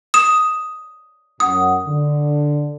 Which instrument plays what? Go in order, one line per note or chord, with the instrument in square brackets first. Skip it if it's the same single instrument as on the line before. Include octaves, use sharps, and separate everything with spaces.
[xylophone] D#6 E7
[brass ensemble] F#2 F#5 [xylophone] D#6
[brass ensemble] D3